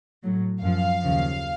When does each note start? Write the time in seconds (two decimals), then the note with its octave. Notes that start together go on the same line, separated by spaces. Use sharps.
0.23 A2 F#3
0.62 F#2 F3 F5
1.02 D#2 C#3 F3